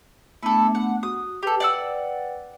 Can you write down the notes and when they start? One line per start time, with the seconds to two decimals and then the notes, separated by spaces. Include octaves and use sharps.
0.43 A3 B3 D4 E4 A4
0.75 F#5
1.03 F#4 D#6
1.43 G4 A4 B4 G5
1.60 D5 F#5 E6